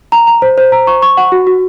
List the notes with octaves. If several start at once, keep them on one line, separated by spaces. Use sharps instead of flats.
A#5
A#5
C5
C5
A#5
C#6
C#6
F#5
F#4
F#4